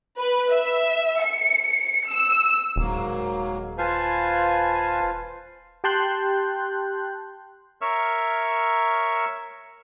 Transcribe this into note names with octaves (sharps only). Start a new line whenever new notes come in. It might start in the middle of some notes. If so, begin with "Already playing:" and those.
B4
E5
C#7
E6
D#1 G#2 F#3 A#3
F4 B4 C5 F5 G#5 A5
G4 G5 A5 C6 F#6 G6
A#4 C#5 E5 C#6 E6 F6